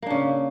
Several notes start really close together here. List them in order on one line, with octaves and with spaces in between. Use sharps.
A#3 D4 C#3